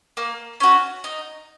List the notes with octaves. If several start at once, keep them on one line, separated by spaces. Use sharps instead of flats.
A#3
C#4 F#4
D#4